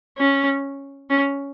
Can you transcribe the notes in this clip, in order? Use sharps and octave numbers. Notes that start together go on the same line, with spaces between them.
C#4
C#4